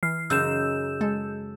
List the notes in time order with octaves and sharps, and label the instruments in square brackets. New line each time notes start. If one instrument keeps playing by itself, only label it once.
[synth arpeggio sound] E3 [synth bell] F6 C7
[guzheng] F#2 C#3 D#4 [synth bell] E6 G6 E7
[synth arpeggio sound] G#3 [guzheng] A4